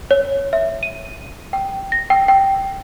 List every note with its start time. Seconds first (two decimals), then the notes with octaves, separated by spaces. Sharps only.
0.11 C#5
0.53 E5
0.83 D#7
1.53 G5
1.92 A#6
2.10 G5
2.28 G5